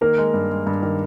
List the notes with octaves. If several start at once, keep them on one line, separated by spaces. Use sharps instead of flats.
D#3 A#3 A#4
G#3
G2
G#3
G2
D#3